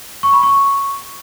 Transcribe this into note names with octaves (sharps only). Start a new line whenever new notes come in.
C#6
B5
C#6